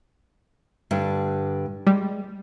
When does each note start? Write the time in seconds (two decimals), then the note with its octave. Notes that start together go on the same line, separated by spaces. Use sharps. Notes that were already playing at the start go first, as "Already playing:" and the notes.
0.91 G2 D3
1.87 G3 G#3